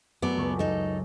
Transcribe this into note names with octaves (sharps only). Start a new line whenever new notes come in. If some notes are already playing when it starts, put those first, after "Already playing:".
F#2 A3 B3 D5
C#2 C#6
D#4 A4